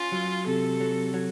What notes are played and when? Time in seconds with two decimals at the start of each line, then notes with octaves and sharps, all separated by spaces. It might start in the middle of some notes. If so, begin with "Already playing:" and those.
Already playing: C#4 F4
0.12 F#3
0.46 C3 A4
0.80 F#3
1.14 F#3